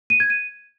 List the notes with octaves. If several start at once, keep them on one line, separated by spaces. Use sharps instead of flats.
D#7
G#6
D#7